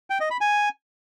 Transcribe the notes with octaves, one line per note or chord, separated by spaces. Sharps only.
G5
D#5
B5
G#5